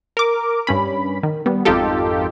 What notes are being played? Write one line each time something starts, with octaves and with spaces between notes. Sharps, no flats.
A#4 D6
G2 C#4 B5
D#3
G3 B3
G#1 F2 D#4 F4 G4 A4